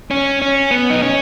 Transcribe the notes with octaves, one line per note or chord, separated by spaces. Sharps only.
C#4
C#4
B3
D#4
C#4